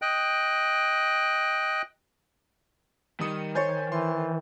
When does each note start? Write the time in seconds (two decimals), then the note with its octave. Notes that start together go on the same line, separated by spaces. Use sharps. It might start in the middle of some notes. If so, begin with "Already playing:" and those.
0.02 D#5 G5 F#6
3.20 D#3 G3 D#6 C#7
3.55 C5 C#5 G#5 G6 A6
3.92 E3 C6